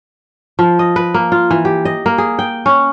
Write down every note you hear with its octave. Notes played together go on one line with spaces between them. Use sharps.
F3
D#5
B4
A#3
F4
E3
G4
D#5
A#3
G#4
G5
C#4